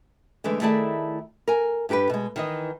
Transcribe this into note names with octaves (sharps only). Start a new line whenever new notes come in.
D3 E3 G#3 A3
D#3 A3 E4 G#4 D5 A5
A#4 G#5
G2 D4 G4 A4 B4
B2 G#3
D#3 E3 D#5